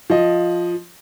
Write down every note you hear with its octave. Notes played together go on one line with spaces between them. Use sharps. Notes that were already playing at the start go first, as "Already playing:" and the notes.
F3 D#5